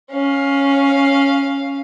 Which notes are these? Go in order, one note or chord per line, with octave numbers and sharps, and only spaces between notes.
C#4 F5